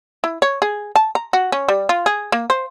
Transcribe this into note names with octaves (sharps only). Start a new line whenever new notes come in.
E4
C#5
G#4
A5
A#5
F#4
C#4
G3
F4
G#4
A#3
C5